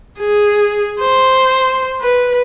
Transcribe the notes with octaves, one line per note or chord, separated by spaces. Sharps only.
G#4
C5
B4